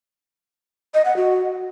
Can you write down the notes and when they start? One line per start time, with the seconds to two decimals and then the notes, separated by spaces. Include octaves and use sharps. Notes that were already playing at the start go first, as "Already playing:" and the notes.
0.94 D#5
1.05 F#5
1.16 F#4